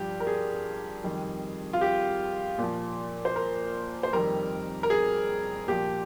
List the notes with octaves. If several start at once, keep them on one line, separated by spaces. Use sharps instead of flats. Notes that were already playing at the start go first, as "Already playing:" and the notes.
Already playing: G2 F3 G4
A#4
G#4
F2 D#3 G3
F4
G4
A#2 F3
C5
A#4
C5
F2 D#3 G3 A#4
A#4
G#4
A#2 F3 G4